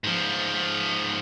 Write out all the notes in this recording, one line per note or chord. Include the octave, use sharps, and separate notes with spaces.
G#2 F3